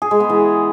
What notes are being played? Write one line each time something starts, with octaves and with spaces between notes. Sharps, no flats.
G#4
G#3
B3
E3